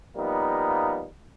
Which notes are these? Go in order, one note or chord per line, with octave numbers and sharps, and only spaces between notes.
F3 G3 A#3 B3 D#4